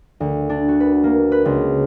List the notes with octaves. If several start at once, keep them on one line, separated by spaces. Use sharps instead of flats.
D2
D4
F#4
B4
A#3
B4
C#2